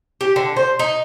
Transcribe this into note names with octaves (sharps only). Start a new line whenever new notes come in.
G4
D3
C5
D#4